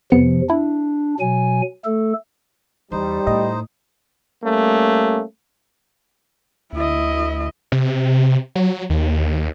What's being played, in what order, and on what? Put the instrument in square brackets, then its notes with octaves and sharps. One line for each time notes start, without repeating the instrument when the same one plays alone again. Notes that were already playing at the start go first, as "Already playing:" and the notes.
[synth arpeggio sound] F2 B3 C#7 [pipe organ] C3 F3
[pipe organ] D4 [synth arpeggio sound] E4
[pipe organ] B2 F#3 G#5
A3 A4
[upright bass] E2 [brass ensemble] G3 [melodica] D#4 C5
[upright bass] A2 [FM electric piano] D#5
[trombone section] G3 A3 A#3 C#4
[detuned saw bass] D2 [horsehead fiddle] E4 D#5
[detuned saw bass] C3
F#3
D#2